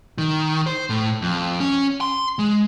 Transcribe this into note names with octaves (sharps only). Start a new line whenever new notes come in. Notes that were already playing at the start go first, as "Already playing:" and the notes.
D#3
C5
A2
F2
C#4
C6
G#3